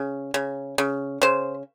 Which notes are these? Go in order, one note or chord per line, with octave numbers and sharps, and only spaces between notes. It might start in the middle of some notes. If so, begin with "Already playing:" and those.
Already playing: C#3
C#3
C#3
C#3 C5